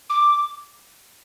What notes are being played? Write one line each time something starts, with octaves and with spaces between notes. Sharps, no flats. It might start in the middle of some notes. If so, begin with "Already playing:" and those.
D6